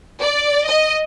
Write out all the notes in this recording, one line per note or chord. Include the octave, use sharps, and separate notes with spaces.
D5
D#5